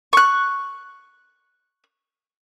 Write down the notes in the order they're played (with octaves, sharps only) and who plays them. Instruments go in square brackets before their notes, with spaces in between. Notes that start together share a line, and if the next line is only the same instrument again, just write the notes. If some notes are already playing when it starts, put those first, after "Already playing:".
[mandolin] C#6 F#6